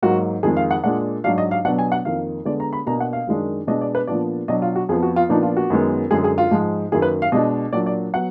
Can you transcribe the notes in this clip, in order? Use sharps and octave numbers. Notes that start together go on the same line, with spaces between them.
G#2 F#3 A#3 F#4
F2 D#3 G#3 G#4
F5
F#5
A#2 G#3 D4 F#5
G#2 F#3 D4 F5
D#5
F5
B2 F#3 B3 D4 F#5
G#5
F#5
F2 D#3 A#3 F5
D3 G#3 B3 D5
A#5
B5
B2 A#3 D4 A#5
F#5
F5
F#2 D#3 G#3 D4
B2 G#3 B3 D4 D#5
D5
B4
A#2 F3 B3 D4 D5
B2 F#3 D4 D#5
F4
F#4
F2 F3 B3 G#4
F#4
F4
A#2 F3 B3 D4 D#4
F4
F#4
F#2 D#3 G#3 B3
F#2 D3 G#3 G#4
G#4
F4
G#2 F3 G#3
F#2 D#3 A#3 G#4
B4
F5
B2 G#3 D4 D#5
A#2 F#3 D4 D5
D5
F#3 B3 F#5